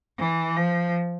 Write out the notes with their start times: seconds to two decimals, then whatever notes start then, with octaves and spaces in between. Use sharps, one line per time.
0.19 E3
0.57 F3